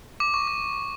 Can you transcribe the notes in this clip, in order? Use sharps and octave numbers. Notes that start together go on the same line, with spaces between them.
D6
C#6
D6